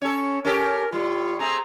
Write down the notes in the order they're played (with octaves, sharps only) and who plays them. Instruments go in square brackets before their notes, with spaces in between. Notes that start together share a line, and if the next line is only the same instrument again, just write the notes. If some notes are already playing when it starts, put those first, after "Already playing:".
[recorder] C#4 [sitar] A4 C#5
[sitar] C#4 G4 A4 [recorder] A#4
[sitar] A2 G3 [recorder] F4
[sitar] A3 C4 G#4 [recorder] A#5